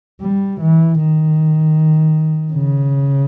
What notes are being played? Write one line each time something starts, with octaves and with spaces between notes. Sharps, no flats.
G3
E3
D#3
C#3